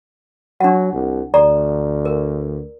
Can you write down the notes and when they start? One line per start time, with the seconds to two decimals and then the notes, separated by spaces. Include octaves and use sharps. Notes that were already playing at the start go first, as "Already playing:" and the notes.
0.60 F#3 D4 F#5
0.93 C2
1.34 D2 A4 D5 A#5
2.05 A#4